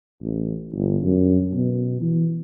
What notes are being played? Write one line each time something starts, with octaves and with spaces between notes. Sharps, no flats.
A1
G1
F#2
B2
E3